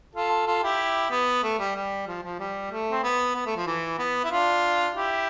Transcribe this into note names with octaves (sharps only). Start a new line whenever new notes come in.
F4 A4
F4 A4
E4 G4
B3
A3
G3
G3
F3
F3
G3
A3
C4
B3
B3
A3
F3
E3
B3
E4
D4 F4
E4 G4